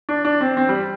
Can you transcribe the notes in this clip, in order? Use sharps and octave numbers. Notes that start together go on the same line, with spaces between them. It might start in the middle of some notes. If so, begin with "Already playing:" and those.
D4
D4
C4
C4
G3